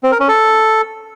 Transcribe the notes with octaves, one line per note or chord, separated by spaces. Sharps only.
C4
A#4
C#4
A4